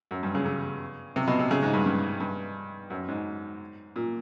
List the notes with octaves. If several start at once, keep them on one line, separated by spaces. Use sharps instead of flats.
F#2
G2
C#3
C#3
C3
B2
C3
C#3
G#2
G2
G2
G2
F#2
G#2
A#2